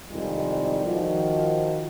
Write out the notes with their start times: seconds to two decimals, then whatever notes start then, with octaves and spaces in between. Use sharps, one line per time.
0.10 C2 F2 D#3 G3 G#3 F4
0.85 D#3 F3 F#4